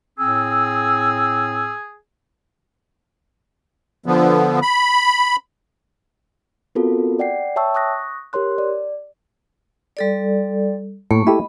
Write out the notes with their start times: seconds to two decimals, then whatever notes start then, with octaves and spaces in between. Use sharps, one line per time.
0.19 A2 C4 G#4 E6
4.06 D3 F3 B3
4.62 B5
6.75 B3 C4 F4 F#4 A4 A#4
7.19 D5 F#5 G5 C7
7.56 C#5 E5 G5 A5 C#6 E6
7.75 C#6 D#6 F#6 A#6
8.33 G4 A#4 C#5 C6 F#6
8.58 D5
9.97 G3 A4 D5
11.11 A2 A3 A#3 C#6
11.27 E4 G4 A4 D#5 B5